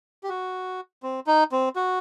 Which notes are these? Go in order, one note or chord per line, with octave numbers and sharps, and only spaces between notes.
G4
F#4
C4
D#4
C4
F#4